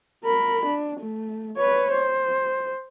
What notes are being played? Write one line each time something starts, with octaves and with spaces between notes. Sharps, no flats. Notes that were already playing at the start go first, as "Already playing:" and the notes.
A#4 B5
D4
A3
B4 C#5
C5